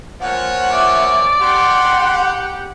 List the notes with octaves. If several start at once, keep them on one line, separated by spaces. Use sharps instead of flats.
A#2 F3 C#5 F#5
D5 E5
G4 F#5 C6